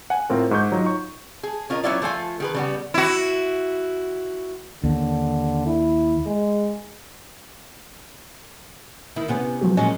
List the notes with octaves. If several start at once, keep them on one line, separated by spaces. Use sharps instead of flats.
F#5 G#5
A2 C4 F4 A#4
G#2 C#6 G6
F#3 D#4 F4 F#4
C#6
G#4
C#4 F4 A#4 D#5
F#3 B3 C#4 E4 F4 D5
F3 A3 F4 G#5
D#3 G#4 B4
C#3 G3 B3
E4 F#4
D#2 D3
E4
G#3
D#3 E4
C3 B3 C#4
F3 F#3 F#4
A#2 G#3 C#4